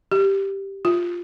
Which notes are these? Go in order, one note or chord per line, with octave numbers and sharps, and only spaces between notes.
G4
F4